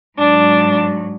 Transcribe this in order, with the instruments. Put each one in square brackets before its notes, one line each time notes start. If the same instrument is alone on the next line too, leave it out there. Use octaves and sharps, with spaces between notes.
[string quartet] G#2 F#3 D4